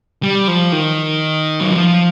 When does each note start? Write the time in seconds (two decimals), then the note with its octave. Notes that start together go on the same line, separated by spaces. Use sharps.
0.23 G3
0.48 F3
0.72 D#3
1.61 F#3
1.71 F3